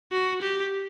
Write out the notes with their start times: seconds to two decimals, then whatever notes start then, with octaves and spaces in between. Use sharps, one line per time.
0.12 F#4
0.42 G4